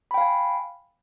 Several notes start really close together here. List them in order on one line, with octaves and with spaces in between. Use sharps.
B5 G5 F5 G#5